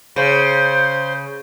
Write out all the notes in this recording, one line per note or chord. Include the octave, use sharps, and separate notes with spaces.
C#3 C5